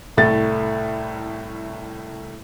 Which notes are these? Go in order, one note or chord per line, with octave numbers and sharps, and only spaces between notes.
C2 A2 A3 A6